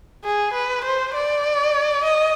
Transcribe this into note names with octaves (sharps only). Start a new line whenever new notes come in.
G#4
B4
C5
D5
D#5